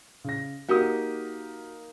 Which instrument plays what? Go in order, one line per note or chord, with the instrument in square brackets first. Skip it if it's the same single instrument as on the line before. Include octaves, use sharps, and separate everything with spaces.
[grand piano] C#3 A#6
[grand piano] A#3 D#4 D#6 [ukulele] F#4 G4